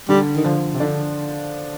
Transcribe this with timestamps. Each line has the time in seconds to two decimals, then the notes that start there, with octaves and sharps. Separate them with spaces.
0.09 D3 G3
0.36 D#3
0.44 D3 F3
0.74 C3
0.80 D3 D4